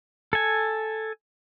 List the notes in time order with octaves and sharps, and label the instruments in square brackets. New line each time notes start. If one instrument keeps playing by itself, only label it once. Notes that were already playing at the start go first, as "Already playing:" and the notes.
[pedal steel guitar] A4 G#5